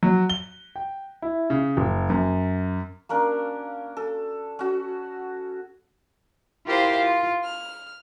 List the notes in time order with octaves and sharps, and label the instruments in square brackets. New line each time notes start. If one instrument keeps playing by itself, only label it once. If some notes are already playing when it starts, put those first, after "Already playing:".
[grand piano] F#3
G7
G5
E4
C#3
F#1
F#2
[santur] A#3 C#4 D4 A#4
A4
C#4 F#4
[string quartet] E4 F4 G4 A#4 C5 F5
F4
F6